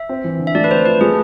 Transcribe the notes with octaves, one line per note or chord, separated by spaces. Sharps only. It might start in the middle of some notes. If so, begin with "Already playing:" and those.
Already playing: E5
C4
E3
D3
E5
A3 D5
B4
C4 C5
F3 B4
A3 G#4